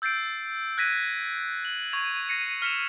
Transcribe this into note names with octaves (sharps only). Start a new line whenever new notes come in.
E6 G6 A6 C7 D7
F#6 G#6 A#6 B6 D#7
F#7
C#6 G#6 F7
A#6 C7 C#7 D#7
F6 B6 C#7 E7 F7